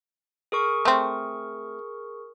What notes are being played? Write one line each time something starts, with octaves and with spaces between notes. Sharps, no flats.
G#4 A#4 C#6
A3 C4